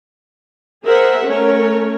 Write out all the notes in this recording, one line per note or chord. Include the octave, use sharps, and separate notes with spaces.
G#4 A#4 C5 E5 F#5
A3 C#4 A#4 C#5